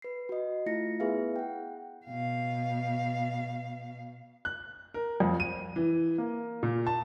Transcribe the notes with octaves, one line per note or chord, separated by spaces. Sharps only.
B4 C7
F#4 D#5
A3 E4 F4 A#6 C#7
B3 E4 G#4 B4 E5 F5
F#5 G5
B2 F5
F#6
A#4
F2
D#7
E3
A#3
A#2
A5